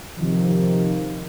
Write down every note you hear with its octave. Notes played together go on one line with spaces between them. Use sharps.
C3 D#3 F3